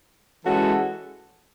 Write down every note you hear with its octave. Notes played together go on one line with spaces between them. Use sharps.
E3 G#3 C#4 F#4 A4